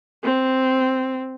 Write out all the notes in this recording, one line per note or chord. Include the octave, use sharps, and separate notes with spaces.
C4